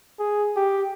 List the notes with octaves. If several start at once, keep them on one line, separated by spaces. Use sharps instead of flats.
G#4
G4